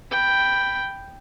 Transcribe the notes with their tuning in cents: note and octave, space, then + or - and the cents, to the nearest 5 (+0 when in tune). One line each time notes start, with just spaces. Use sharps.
G5 +0 B5 +0